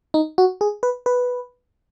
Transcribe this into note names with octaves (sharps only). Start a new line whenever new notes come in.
D#4
F#4
G#4
B4
B4